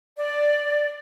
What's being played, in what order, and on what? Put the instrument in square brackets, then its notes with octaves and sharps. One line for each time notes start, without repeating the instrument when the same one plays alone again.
[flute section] D5